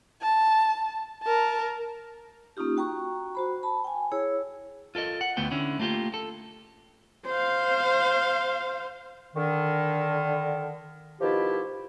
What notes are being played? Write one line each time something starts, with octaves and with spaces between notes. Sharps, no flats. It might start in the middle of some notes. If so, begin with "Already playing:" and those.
A5
A#4 A5
A#3 C#4 D#4 F4 G4
F#4 G5 A#5 C#6
F#4 C5 B5
A5 B5
G5 G#5
E4 G#4 C#5 E6
F4 A4 A#4 D#5
F#5
D2 A3 B3 G5
D3 C#4 E4
A3 A#3 F4 G4
A4
C5 F5
D3 D#3
B2 D#3 F3 E4 G4